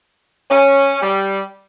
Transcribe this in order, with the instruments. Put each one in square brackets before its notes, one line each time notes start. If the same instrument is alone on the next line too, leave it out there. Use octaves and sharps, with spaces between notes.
[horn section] C#4
G3